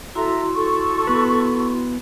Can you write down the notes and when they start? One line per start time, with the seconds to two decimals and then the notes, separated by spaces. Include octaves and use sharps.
0.15 E4 F#4 A4 E5 A#5 C6
0.55 A4 C#6
1.07 B3 B4